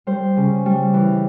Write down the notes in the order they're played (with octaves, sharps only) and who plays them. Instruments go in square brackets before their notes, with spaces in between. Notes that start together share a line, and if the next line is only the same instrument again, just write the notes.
[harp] G3 C5
C#3
G3
E3